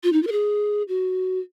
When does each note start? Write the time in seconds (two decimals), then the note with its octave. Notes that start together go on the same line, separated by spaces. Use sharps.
0.03 F4
0.13 D#4
0.23 F4
0.27 A#4
0.32 G#4
0.88 F#4